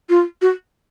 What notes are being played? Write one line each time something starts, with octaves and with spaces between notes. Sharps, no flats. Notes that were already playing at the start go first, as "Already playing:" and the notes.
F4
F#4